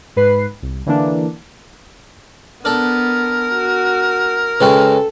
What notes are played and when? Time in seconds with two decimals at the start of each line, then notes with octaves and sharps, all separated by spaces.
0.16 G#2 B4 C7
0.62 C2
0.86 D3 E3 A#3 D4
2.65 B3 D4 A4 A#4
3.53 F#4
4.61 C#3 G#3 F#4 A4 B4 G5